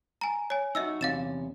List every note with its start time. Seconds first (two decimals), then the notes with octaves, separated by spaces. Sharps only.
0.21 G#5 A#5
0.50 C#5 G#5
0.75 D#4 F#4 D#5 E5 E6
1.01 E2 C3 C#4 F5 A6 E7